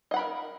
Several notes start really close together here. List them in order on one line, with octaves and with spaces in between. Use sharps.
D#5 F#5 B5 A#4